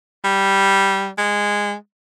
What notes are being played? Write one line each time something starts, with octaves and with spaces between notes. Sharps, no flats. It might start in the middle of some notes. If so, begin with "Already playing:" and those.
G3
G#3